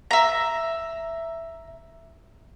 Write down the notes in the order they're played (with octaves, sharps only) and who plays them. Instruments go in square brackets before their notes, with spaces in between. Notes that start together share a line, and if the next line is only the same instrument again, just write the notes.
[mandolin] E5 A#5